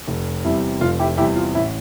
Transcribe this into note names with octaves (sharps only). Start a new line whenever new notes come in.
F1
E2 C3 G3 E4
F1 F4
E4 G4
E2 C3 G3 E4 G4
F4
A1 E4